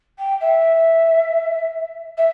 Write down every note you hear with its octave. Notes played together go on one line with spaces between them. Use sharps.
G5
E5
E5